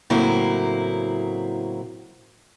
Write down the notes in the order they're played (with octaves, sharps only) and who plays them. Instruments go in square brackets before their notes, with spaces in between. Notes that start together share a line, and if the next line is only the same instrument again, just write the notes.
[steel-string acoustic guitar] A2 C#3 F#3 A#3 C4 E4